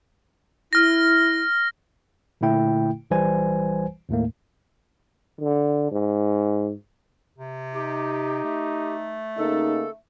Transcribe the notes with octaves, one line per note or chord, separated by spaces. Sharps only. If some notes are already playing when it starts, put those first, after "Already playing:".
E4 F6 A#6
A#2 D3 A3 E4 G5
A#1 E3 G3 B4 C5 G#5
D#2 A2 A3 A#3
D3
G#2
C3
D#4 G4
A3
C#3 A#3 D#4 A4